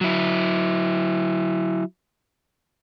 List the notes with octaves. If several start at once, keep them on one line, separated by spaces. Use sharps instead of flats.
F#3 E4